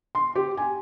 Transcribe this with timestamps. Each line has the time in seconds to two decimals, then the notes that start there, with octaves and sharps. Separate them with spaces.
0.15 C6
0.35 G4
0.57 G#5